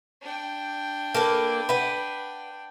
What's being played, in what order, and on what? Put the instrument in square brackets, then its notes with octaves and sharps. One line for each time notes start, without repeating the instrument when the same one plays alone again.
[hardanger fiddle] D4 G5
[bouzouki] A#3 A4 B4
B4 F#5